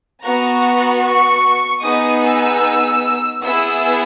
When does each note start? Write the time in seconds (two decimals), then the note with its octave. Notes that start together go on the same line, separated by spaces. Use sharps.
0.23 B3 F#4 A#5
1.03 C#6
1.84 B3 D#4 G#4 D#6
2.24 E6
3.45 B3 E4 G#4 E6